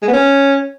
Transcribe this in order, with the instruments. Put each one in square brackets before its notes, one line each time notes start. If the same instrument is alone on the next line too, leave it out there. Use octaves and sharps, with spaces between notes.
[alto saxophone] G#3
B3
C#4